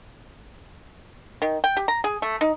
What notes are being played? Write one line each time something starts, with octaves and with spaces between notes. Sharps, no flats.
D#3
G5
G4
A#5
G#4
A3
D#4